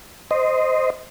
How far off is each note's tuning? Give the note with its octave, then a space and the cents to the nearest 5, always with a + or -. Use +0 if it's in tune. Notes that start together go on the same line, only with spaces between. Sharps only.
C5 -10 D#5 +0